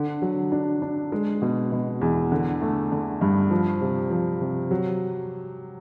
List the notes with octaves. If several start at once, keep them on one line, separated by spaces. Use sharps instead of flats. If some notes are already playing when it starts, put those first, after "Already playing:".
Already playing: D3
F#3
D4
D4
G#3
B2
B2
E2
D3
A3
D3
G2
F3
C3
F3
C3
F#3